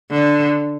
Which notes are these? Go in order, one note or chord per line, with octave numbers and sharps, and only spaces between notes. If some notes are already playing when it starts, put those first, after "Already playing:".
D3